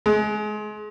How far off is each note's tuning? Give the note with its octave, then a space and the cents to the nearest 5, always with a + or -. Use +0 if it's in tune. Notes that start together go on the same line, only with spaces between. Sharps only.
G#3 +30